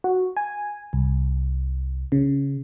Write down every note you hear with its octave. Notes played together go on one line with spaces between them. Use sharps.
F#4
G#5
C2
C#3